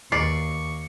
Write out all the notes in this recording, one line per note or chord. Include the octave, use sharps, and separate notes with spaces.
D#2 D5 C#6 C7